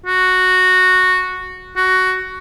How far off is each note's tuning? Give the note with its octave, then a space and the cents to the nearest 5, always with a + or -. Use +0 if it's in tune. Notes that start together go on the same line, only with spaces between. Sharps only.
F#4 -5
F#4 +10